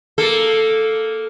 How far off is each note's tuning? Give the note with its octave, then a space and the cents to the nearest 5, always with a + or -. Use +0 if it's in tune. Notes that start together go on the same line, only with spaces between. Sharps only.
A#3 +0 A4 +0